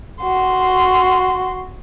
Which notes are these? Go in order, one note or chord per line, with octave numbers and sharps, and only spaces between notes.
F#4 C6